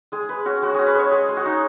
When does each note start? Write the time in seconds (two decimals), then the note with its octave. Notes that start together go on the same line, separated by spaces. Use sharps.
0.12 G#3 G#4
0.29 G#3 B4
0.45 C#4 F#4
0.62 G#3 F#4
0.74 C#4 G#4
0.86 B4
0.95 G#3 C#5
1.11 G#3 G#4
1.29 G#3
1.37 F#4
1.45 D#4